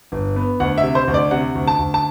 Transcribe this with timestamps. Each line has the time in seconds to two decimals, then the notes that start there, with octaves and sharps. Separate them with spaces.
0.12 G1
0.36 B3
0.60 D2 F#5
0.78 E5
0.83 C3
0.95 C5
1.08 D2
1.14 D5
1.31 C3 F#5
1.55 D2
1.67 A5
1.79 D2
1.94 A5